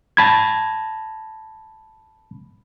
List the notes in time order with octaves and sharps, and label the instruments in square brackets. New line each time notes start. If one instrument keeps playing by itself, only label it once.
[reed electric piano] A5 B5 G#6